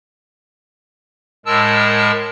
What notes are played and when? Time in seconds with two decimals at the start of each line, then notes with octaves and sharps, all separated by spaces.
1.46 A2 G#3 A#4 A5 E6